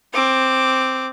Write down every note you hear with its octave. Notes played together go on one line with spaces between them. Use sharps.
C4 D6